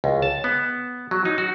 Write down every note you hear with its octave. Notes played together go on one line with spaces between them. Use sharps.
C#2
A5
B3
F#3
D#4
F#4